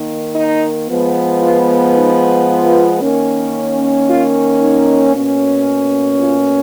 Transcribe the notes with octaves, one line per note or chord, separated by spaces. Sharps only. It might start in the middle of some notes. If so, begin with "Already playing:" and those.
Already playing: D#3 A#3 D#4
D#4
F3 G#3 B3
F4
D#4
F4
D#3 A#3 C#4
F4
D#4
B2 A#3 C#4
F4